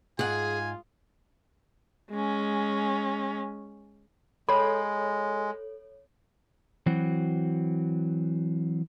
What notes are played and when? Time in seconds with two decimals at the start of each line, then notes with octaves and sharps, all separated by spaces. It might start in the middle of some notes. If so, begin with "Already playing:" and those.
0.19 G#2 F4 G#4 F#5 G#5
2.11 G#3 C#4
4.49 G#3 A4 C#5 B5
6.86 E3 F#3 C4 F#4